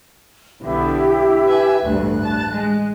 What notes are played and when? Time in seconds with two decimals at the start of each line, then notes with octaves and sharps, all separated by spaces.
0.62 B1 D3 B3 E4 G4
1.45 B4 E5 G#5
1.83 A1 D2 G2 F#6
2.23 A5 A6
2.51 G#3